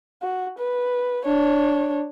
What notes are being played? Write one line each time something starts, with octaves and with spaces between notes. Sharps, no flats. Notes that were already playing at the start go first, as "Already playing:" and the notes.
F#4
B4
D4 C#5